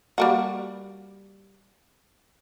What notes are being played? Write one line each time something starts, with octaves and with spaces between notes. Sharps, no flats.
G3 A#3 F#4